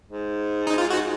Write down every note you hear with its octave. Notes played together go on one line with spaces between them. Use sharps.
G#2
D#4
F4
F#4